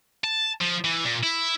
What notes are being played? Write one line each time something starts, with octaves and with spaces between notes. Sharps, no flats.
A5
F3
E3
A#2
E4